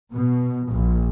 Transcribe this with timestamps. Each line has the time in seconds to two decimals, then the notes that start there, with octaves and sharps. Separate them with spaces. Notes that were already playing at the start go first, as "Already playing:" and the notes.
0.13 B2
0.70 A#1